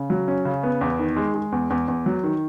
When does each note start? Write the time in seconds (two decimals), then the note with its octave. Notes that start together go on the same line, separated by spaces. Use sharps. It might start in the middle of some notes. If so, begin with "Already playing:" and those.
Already playing: C#3
0.10 F#3
0.28 C#4
0.45 C#3
0.63 B3
0.81 E2
0.99 D#3
1.16 G#3
1.34 G#3
1.52 E2
1.70 E2
1.88 E2
2.06 F#3
2.24 D#3